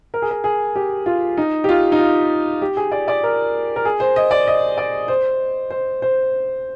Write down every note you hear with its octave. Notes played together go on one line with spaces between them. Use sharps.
A#4
G#4
A#4
G#4
G4
F4
D#4
G4
F4
D#4
F4
G4
G#4
D5
D5
A#4
A#4
G#4
C5
D#5
D5
D#5
D5
C5
C5
C5